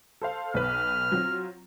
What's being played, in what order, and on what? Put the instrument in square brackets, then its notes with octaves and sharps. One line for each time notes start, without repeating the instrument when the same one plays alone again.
[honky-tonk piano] A4 C5 F5
[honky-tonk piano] B1 B4 [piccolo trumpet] F6
[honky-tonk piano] F#3 C4 F4